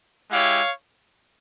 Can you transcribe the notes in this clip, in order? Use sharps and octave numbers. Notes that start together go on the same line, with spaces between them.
G#3 E4 G4 C#5 F5